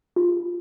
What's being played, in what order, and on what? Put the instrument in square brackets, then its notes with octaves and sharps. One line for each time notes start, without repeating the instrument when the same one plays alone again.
[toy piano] F4